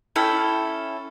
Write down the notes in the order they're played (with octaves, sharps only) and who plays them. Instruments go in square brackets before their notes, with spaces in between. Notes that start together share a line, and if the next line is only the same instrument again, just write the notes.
[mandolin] C#4 E4 A4 G5